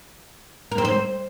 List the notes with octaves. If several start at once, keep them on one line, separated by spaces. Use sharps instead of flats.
A#4
C4
C5